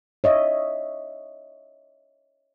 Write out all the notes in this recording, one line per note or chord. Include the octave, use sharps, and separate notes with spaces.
C#5 D#5 E5